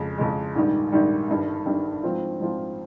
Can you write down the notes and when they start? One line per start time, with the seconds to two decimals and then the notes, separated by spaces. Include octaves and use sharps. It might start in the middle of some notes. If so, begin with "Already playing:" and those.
Already playing: F2 C#3 G#3
0.18 F2 C#3 G#3
0.55 A#1 G#2 D#3 G3
0.92 A#1 G#2 D#3 G3
1.29 G1 G2 D#3 G3
1.66 G1 G2 D#3 G3
2.03 G#2 F3 C4 F4
2.40 G#2 F3 C4 F4